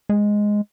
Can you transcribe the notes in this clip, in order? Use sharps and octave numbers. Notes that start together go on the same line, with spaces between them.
G#3